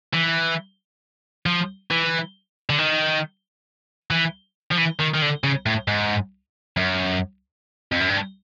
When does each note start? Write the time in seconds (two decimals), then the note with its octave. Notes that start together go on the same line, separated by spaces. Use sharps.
0.13 E3
1.46 F3
1.91 E3
2.70 D3
2.79 D#3
4.11 E3
4.71 F3
4.77 E3
4.99 D#3
5.14 D#3
5.22 D3
5.44 C#3
5.66 A2
5.88 G#2
6.77 F#2
7.92 F2
8.01 F#2
8.09 G2